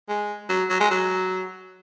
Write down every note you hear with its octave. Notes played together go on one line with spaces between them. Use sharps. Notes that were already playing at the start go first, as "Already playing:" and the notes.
G#3
F#3
F#3
G#3
F#3